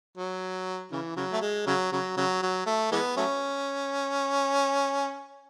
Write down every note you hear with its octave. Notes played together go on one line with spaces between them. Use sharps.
F#3
C#3 E3
C#3 F#3
A3
G#3
C#3 F#3
C#3 F#3
C#3 F#3
F#3
A3
E3 G#3 B3
F#3 A3 C#4